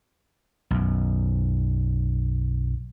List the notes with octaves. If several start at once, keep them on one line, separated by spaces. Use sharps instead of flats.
B1 F#2